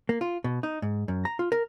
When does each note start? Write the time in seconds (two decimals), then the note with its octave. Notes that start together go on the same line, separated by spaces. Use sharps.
0.09 A#3
0.21 F4
0.44 B2
0.63 D#4
0.82 G#2
1.08 F#2
1.25 A#5
1.39 F4
1.52 A#4